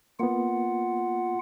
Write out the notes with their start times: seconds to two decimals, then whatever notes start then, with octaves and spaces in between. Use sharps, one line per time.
0.20 A#3 B3 F4 F#5